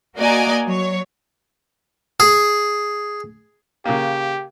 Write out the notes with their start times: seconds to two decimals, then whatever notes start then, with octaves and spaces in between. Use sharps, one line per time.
0.17 A#3 F#4 D5 D#5 G#5 A#5
0.67 F#3 C#5
2.20 G#4
3.85 C#3 A#3 G4